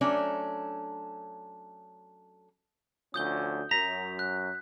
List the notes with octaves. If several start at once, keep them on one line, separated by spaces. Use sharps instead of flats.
F#3 A3 C#4 D4
D2 F3 C#4 D#6 G6 G7
F#2 A#5 B6
F#6